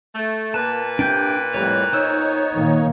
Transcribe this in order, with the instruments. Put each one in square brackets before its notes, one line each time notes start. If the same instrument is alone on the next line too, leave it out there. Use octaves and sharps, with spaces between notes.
[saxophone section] A3
[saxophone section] A#2 B4 [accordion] A#3 [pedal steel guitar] A5
[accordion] C3 [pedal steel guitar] D4 G5 G6
[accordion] F2 A2 G3 [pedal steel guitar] C#5 A#5
[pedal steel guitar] B3 C5 E6 [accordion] D#4 C#5
[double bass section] A#2 D#3 A#3